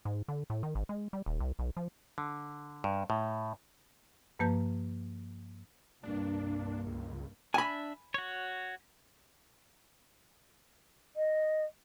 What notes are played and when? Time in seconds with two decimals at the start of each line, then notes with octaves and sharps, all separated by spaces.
0.05 G#2
0.28 D3
0.50 A2
0.63 D#3
0.75 G#1
0.89 G#3
1.13 G3
1.26 D#1
1.40 C2
1.59 B1
1.77 F3
2.18 D3
2.84 G2
3.10 A2
4.39 G2 F3 A#3 B4 A5 G6
6.03 C2 G2 A#3 D4
6.86 C#2
7.54 D4 E5 G#5 B5
8.14 F#4 C#5
11.16 D#5